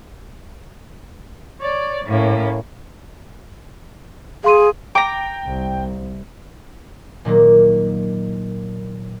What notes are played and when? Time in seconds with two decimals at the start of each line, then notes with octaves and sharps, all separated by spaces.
1.61 C#5 D5
2.07 A2 A#3 C#4
4.44 G#4 F5 C6 D#7
4.95 G5 A#5 D6
5.45 C2
7.25 A#2 D#3 F#3 A#3